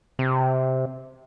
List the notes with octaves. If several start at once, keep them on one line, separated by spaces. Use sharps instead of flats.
C3